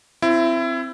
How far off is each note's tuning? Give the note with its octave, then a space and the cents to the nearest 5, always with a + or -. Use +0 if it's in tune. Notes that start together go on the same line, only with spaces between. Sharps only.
C4 +0 E4 +25